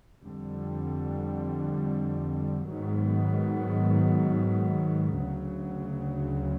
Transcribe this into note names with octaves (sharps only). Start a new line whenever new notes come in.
F2 D3 G3
G#2 D#3 F#3 B3
D2 C#3 F#3